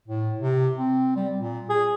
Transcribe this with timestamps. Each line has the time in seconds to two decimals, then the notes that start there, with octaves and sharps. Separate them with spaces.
0.08 A2
0.40 C3
0.78 C4
1.16 G3
1.38 A#2
1.69 G#4